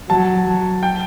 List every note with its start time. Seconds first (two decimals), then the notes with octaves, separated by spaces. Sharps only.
0.10 F#3 A5
0.83 G5